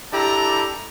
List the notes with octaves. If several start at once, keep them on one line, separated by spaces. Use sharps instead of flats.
D4 E4 G4 A4 A#5